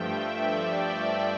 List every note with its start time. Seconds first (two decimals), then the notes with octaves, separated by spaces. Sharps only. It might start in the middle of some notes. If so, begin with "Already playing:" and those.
Already playing: G2 F3 A3 E5 G5
0.26 D5
0.72 D5